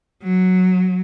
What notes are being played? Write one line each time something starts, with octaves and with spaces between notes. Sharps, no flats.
F#3